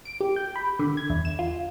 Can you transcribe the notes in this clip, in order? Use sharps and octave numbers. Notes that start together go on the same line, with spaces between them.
D7
G4
G6
B5
D3
G#6
E2
E7
F4